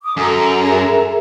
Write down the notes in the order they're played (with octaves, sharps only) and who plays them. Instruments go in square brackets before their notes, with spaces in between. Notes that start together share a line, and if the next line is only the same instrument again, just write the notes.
[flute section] D6 D#6
[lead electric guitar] F#2 [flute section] A4 A#5
[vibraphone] G#4 A#4 E5